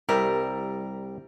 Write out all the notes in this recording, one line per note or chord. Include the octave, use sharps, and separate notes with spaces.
C2 G3 A#4 E5